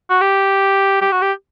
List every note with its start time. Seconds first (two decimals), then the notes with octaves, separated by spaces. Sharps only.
0.10 F#4
0.21 G4
1.02 G4
1.12 F#4
1.22 G4